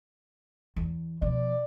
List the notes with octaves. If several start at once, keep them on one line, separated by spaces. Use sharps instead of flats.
E2
B2 F3 D5